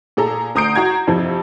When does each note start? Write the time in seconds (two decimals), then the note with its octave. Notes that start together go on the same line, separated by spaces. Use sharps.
0.17 A#2 G#4 A4 A#5
0.55 D2 A#5 D#6 G6 C7 D7
0.76 F#4 A#5 G#6
1.07 F2 C3 F3